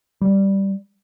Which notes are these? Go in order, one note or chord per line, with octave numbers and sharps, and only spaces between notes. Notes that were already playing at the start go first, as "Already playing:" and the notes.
G3